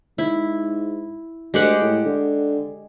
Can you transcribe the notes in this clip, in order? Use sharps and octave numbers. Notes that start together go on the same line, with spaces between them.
G#2 E4
D2 G#3 G4 F#5
A2
D3